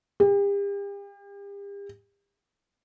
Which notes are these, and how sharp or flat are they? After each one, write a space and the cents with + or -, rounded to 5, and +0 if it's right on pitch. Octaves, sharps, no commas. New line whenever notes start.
G4 +40